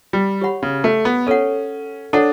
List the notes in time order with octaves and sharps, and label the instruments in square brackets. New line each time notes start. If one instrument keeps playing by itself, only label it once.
[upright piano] G3
[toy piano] G4 C#5 F#5 B5
[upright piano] C#3
A3
B3
[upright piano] C#4 [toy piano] A4 C#5 F#5
[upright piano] D4 [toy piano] A4 C#5 F#5